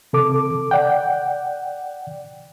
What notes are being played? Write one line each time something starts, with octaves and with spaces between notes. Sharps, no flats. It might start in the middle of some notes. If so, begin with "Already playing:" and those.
C3 A4 D6
D5 F#5 G5